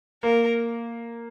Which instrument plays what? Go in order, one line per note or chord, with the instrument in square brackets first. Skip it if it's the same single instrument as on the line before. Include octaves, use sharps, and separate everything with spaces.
[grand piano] A#3 [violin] A#4